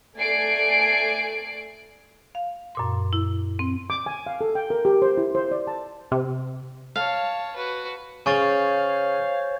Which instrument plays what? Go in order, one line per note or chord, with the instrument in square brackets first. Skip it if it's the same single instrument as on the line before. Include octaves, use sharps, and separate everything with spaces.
[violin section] A3 D5 G#5 C7 D7
[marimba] F5
F#2 A#2 C6
E4
C4
[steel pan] D6
G#5
F5
A4
G5
A#4
G4
C5
E4
C5
D5
A5
[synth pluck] C3
[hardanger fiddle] C#5 A5 [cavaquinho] F5
[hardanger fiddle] F#4 B4
[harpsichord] C#3 [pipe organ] C5 C#5 [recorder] F5 [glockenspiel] G#5 C#6 A6